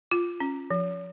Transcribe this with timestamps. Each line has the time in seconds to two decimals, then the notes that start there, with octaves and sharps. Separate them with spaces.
0.11 F4
0.40 C#4
0.71 F3